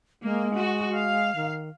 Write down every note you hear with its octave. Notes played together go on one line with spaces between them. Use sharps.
G#3 A#3
F#4
F5
D#3